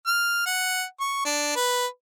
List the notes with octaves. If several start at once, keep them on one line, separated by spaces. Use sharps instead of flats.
F6
F#5
C#6
D4
B4